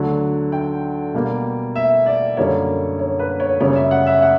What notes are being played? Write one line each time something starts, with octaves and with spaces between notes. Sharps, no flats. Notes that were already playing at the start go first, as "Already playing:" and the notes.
Already playing: D2 D3 F#3
G5
B2 G3 A#3
E5
D5
F#2 D3 G3 A#3 C#5
C#5
B4
C#5
F#2 C#3 G3 C#5
E5
F#5
E5
F#5